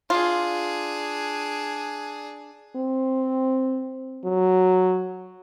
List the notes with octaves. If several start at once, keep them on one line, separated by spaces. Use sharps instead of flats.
D4 F4 G#4
C4
F#3